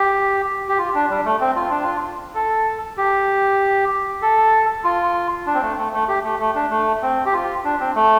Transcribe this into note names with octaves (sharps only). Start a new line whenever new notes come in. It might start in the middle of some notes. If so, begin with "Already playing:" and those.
Already playing: G4
G4
F4
D4
G3
A3
C4
F4
D4
F4
A4
G4
A4
F4
D4
C4
A3
A3
A3
G4
A3
A3
D4
A3
C4
G4
F4
D4
C4
A3